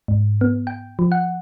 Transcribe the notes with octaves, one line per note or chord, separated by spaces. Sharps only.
G#2
B3
G5
F3
F#5